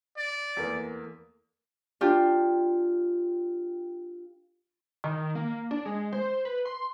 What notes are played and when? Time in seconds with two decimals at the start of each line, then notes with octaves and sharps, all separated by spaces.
0.17 D5
0.57 E2 A3 A#3
2.01 D4 F4 G4
5.04 D#3
5.35 A#3
5.71 D4
5.85 G#3
6.13 C5
6.45 B4
6.65 C6